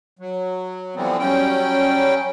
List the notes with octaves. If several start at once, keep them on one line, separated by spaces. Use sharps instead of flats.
F#3
D3 E3 F3 G3 B3 C4
F#3 G3 C#4 G5